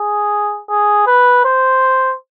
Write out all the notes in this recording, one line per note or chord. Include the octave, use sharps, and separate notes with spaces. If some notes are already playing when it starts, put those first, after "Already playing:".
Already playing: G#4
G#4
B4
C5